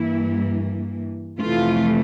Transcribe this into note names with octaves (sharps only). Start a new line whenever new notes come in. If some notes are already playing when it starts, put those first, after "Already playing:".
Already playing: G2 E3 A#3 E4
F2 C3 E3 A3 F4